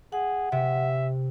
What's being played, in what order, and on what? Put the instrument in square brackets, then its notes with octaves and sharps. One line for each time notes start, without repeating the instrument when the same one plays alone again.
[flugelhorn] G#4 [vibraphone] F#5
[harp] C3 [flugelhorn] E5